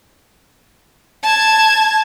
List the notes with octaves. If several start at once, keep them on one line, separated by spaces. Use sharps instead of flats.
A5 G#6